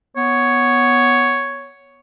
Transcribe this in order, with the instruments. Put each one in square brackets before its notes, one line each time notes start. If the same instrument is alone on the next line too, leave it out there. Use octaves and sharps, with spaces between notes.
[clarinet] B3 [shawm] C#5